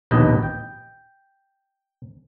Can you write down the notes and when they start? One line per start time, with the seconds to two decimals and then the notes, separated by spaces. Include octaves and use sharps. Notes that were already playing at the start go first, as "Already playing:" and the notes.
0.11 A#1 D#2 B2 B4 D#5
0.43 G5